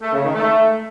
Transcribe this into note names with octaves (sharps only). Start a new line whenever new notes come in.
A3
C#3
D#3
A3